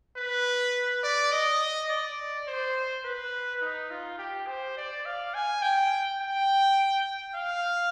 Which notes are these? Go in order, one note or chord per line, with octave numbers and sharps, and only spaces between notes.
B4
D5
D#5
D5
C5
B4
D#4
F4
G4
C5
D5
F5
G#5
G5
G5
F5